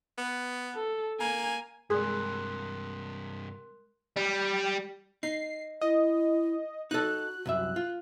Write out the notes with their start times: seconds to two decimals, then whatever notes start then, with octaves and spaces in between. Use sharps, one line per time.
0.18 B3
0.75 A4
1.20 A#3 G#5
1.90 G2 C3 G#3 G#4 A#4 D5 C6 F#6
4.16 G3
5.23 D#4 C7
5.81 E4 D#5
6.91 D#4 F#4 A4 F#6
7.46 C2 F#2 E5
7.76 F4